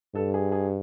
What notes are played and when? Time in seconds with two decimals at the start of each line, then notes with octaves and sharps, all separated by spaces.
0.15 G2 A4
0.34 G#4
0.52 G#4